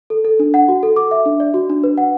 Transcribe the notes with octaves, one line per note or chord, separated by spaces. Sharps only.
A4
A4
D4
F#5
F#4
A4
D6
E5
D4
D5
F#4
D4
B4
F#5